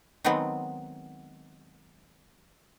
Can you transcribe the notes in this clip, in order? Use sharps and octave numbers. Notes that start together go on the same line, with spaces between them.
D#3 F#3 G#3 B3 C4